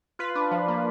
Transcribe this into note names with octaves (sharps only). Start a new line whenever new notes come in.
F4 B4
D4
F3
A#3